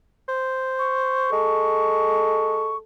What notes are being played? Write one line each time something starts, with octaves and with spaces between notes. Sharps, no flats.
C5
C#6
G#3 A4